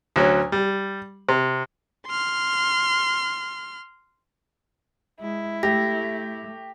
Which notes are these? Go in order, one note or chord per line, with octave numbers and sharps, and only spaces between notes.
D2 F#3 C#4
G3
C3
C6 F6
G#3 E4
A3 G4 A#6